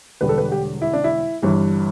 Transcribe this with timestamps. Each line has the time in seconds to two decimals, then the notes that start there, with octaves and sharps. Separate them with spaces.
0.21 E1 E2 D3 G3 B4
0.29 A4
0.38 B4
0.52 G4
0.82 E4
0.93 D4
1.04 E4
1.42 G1 G2 E3